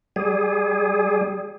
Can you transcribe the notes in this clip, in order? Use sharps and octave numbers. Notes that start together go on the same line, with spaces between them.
G3 G#4